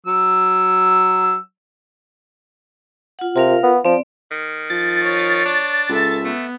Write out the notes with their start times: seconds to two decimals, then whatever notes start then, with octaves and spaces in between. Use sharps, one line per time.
0.07 F#3 E6
3.19 F4 F#5
3.36 C3 F4 A#4 F5
3.63 B3
3.85 F3 C4 D5
4.31 D#3
4.70 F3 A6
5.02 C#5
5.46 D4
5.89 C#2 A4 E5
6.25 A3 B3